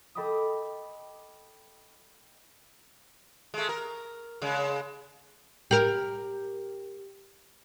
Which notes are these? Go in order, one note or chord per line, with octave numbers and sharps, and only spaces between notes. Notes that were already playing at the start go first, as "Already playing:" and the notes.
A4 D#5 G5 B5 D6 D#6
G#3 A3
A#4
C#3 G#3
G4 A#4